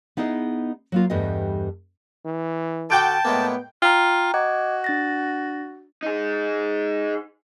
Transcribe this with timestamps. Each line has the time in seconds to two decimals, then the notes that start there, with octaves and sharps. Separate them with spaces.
0.17 B3 D#4 E4 G#4 D#5
0.92 F#3 A#3 F4
1.10 E2 G2 G3 A3 B3 D#5
2.25 E3
2.90 D3 F#4 G5 A5 D6 G6 D7
3.25 A2 G#3 A#3 B3
3.82 F4 G5 A#5
4.34 F#4 D#5 D6 G#6
4.84 D4 A6 A#6
6.03 D#4 G#4